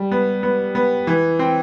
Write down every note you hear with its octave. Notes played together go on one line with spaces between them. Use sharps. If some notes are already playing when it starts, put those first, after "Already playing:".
Already playing: G3
B3
B3
B3
E3
C4